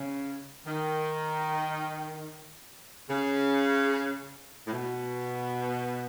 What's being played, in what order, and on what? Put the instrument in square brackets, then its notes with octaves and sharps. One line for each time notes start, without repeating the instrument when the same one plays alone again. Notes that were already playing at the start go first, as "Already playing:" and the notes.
Already playing: [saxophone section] C#3
D#3
C#3
A2
B2